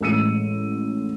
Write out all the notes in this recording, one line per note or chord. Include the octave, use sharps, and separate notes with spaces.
A1 G#3 E6 C#7 D#7